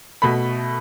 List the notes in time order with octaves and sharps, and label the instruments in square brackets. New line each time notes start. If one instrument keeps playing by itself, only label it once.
[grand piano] B2 A3 B5